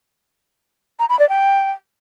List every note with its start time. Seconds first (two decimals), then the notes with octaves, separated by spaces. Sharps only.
0.99 A#5
1.09 B5
1.19 D5
1.29 G5